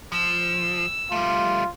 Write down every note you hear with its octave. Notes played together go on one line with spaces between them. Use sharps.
F3 E6
G3 A3 F4